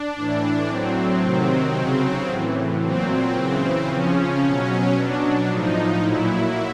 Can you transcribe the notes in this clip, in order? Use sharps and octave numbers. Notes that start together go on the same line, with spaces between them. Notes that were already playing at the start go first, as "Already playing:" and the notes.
Already playing: D4
A2 E3
A2 F#3 C4
C3 D#3 F#3
C#3 F#3
A2 E3
A#2 F#3 C4
C#3 E3
C#3 F3 C#4
B2 F#3
B2 F#3 D4
A2 F3 D#4
A#2 F#3 E4